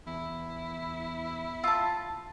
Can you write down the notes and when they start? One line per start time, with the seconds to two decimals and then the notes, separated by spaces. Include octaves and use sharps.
0.07 E2 E4
1.64 F4 A5 E6